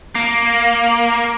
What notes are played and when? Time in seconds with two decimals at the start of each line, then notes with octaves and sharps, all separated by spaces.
0.15 A#3